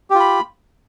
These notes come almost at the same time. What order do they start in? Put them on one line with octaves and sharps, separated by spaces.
G4 F4 B5